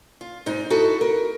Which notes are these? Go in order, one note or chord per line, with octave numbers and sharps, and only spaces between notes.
F4
G#2 D#4
D#4 E4 F#4 A4
A#4